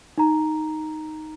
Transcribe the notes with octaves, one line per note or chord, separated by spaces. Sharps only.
D#4 A#5